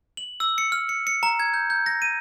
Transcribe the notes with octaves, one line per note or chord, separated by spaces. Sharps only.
F#7
E6
C#7
F6
C#7
C#7
A#5
G#6
G6
G6
A#6
D#7